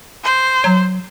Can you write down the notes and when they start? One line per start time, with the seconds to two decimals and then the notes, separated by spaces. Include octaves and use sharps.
0.24 C5
0.64 F#3